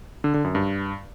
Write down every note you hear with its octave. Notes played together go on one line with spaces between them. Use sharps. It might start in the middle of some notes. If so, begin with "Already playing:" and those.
D3
D3
F#2
G2